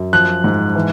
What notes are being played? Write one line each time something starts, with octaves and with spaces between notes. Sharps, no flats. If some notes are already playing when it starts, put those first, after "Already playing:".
Already playing: F#2
F3 F#6
G#2
E3